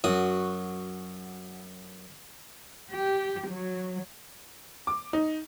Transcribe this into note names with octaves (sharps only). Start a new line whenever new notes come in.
F#2 F#4 D#6
G4
F#3
D6
D#4